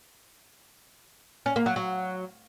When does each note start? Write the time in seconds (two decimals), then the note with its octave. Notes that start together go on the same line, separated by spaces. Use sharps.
1.46 C#4
1.56 A#3
1.66 F#3
1.76 F#3